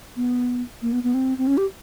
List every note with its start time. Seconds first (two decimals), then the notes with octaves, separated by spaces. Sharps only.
0.16 B3
0.82 A#3
0.93 B3
1.03 B3
1.14 C4
1.38 C4
1.47 C#4
1.57 G4